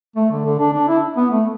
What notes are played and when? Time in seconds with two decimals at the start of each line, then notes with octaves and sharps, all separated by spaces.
0.16 A3
0.31 D3
0.45 D3
0.59 D4
0.73 D4
0.88 E4
1.17 B3
1.31 A3